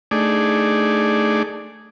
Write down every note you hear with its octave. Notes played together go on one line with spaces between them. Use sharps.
A3 D4 D#4 G#4 D5